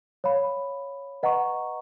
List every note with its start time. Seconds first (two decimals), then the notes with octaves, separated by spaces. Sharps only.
0.24 C#5 F5 B5
1.23 B4 D#5 F#5 A#5 C#6